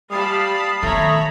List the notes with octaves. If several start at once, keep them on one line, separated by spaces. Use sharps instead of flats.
G3 F5 A5 B5 D#6
D#3 A3 B3 C#5 A#5 B5